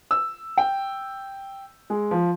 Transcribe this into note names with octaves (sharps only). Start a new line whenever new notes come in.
E6
G5
G#3
F3